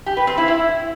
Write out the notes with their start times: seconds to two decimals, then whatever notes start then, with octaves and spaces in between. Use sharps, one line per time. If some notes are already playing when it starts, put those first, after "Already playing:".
0.06 G4
0.17 B4
0.27 C4
0.38 E4
0.48 E4